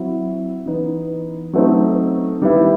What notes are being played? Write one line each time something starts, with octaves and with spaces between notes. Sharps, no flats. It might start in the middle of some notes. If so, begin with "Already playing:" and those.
Already playing: F#3 C4 E4
E3 B3 D#4
F#3 A3 C4 D#4
D#3 G3 B3 E4